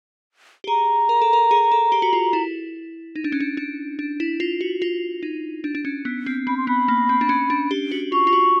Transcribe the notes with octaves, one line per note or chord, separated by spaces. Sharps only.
G4
G#4 A#5
A#4
A4
A#4
G#4
A4
G4
F#4
F4
E4
D#4
D4
C#4
D4
D4
D4
E4
F4
F#4
F4
D#4
D4
D4
C#4
B3
C4
C4 B5
C6
B3 B5
A#3
C4
D4
C#4
D4
G4
F#4
F4 C#6
F4
F#4